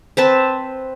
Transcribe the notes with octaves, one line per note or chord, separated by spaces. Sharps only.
C4 B4 A5